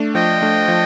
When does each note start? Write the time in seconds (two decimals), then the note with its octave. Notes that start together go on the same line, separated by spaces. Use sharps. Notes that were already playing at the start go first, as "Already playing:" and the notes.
Already playing: A3 D4
0.15 F3 D#5 G5
0.42 A3 D4
0.68 F3